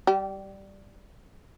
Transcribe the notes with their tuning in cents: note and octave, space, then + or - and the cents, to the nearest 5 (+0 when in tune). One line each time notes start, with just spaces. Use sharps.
G3 +0 G4 -25